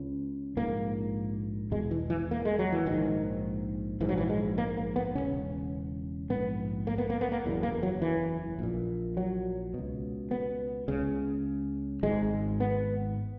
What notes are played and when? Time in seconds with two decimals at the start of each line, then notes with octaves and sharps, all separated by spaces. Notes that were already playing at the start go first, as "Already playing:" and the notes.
Already playing: C#2 C#3
0.57 A#1 G#2 A#3
1.71 E1 E2 B2 G#3
1.91 E3
2.10 E3
2.31 A#3
2.45 G#3
2.59 F#3
2.72 E3
2.86 A#1 G#2 D#3
4.00 A#1 G#2 E3
4.09 F#3
4.18 E3
4.29 G#3
4.58 A#3
4.77 A#3
4.96 B3
5.15 E1 D#2 C#3 C#4
6.30 A#1 G#2 B3
6.87 A#3
6.98 B3
7.10 A#3
7.21 B3
7.32 A#3
7.45 F#1 E2 B2
7.63 A#3
7.83 F#3
8.02 E3
8.59 A#1 A#2
9.17 F#3
9.74 C#2 B2
10.31 B3
10.88 C#2 C#3
12.03 G#1 G#2 G#3
12.60 B3